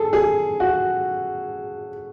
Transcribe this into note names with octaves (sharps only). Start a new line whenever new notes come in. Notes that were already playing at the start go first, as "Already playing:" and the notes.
Already playing: G#4 A4
G#4
F#4